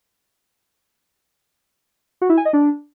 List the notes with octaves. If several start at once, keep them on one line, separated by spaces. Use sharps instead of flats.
F#4
E4
G#5
D#5
D4